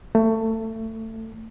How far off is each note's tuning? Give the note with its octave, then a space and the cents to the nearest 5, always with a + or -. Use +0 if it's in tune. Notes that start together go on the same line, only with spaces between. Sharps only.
A3 +25